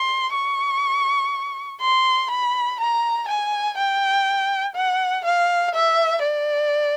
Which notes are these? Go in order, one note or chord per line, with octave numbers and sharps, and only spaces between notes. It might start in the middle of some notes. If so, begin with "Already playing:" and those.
Already playing: C6
C#6
C6
B5
A#5
G#5
G5
F#5
F5
E5
D5